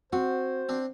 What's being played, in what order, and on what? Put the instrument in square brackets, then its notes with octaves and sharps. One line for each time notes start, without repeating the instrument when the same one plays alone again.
[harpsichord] C4 [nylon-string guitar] F#4 [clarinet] C5
[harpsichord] C4 D4